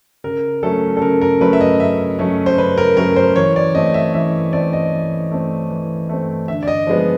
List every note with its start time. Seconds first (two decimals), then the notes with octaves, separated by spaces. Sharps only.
0.24 C#3 A#4
0.63 F#3 A3 C#4 A4
0.97 A4
1.02 C#3 A#4
1.21 A#4
1.41 F#3 A3 C#4 B4
1.53 E5
1.61 D#5
1.79 C#3 E5
2.19 F#3 A3 C#4
2.46 C5
2.58 C#3 B4
2.78 A#4
2.97 F#3 A3 C#4 A#4
3.16 C5
3.36 E3 C#5
3.56 D5
3.75 A3 C4 D#5
3.94 E5
4.14 E3 E5
4.53 A3 C4 D5
4.73 D#5
4.93 E3
5.31 A3 C4
5.70 E3
6.09 A3 C4
6.48 D3 E5
6.63 D5
6.68 D#5
6.87 F3 G#3 B3